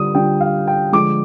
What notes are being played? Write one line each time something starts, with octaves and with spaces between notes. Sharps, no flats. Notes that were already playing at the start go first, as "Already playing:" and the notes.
Already playing: D3 G3 F4 D#6
D3 G3 D4 F4 G5
F5
G5
D3 F3 G#3 D6